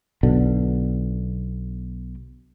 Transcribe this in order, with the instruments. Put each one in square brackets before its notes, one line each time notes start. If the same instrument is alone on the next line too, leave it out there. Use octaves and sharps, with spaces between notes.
[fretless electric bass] B1 B2 D3